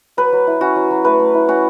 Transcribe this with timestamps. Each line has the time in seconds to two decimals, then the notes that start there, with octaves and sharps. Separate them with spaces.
0.17 F#3 B4
0.33 F#3
0.47 E4
0.61 C#4 F#4
0.76 F#3
0.91 F#3
1.05 A3 B4
1.19 A3
1.34 E4
1.48 C#4 F#4